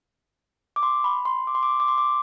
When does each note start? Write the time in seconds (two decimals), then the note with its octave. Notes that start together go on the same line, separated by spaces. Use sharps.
0.76 D6
0.83 C6
1.04 B5
1.25 C6
1.47 D6
1.55 C6
1.63 D6
1.80 D6
1.88 C6
1.98 D6